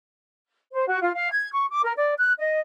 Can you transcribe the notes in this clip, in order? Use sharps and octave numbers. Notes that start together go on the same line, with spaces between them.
C5
F#4
F4
F5
G#6
C#6
D6
A#4
D5
F#6
D#5